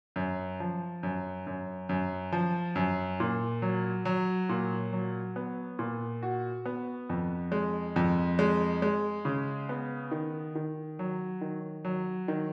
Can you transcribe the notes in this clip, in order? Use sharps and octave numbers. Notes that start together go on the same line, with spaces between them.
F#2
F3
F#2
F#2
F#2
F3
F#2
A#2
F#3
F#3
A#2
F#3
B3
A#2
F#4
B3
F2
G#3
F2
G#3
G#3
C#3
B3
D#3
D#3
F#3
D#3
F#3
D#3